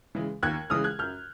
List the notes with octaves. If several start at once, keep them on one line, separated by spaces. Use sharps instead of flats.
C#3 E3 G#3
D#2 F#6 G#6
C#3 E3 G#3 D#6 F6
F#6 G#6
F#2 F6 G6